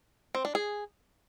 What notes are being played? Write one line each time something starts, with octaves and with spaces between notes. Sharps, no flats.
C4
D4
G#4